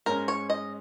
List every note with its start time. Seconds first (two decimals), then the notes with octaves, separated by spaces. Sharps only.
0.06 G#2 G#3 C#4 A#4
0.28 C#5
0.50 D#5